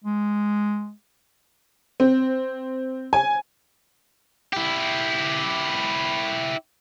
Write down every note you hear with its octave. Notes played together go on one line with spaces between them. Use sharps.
G#3
C4
G#5
E4 G4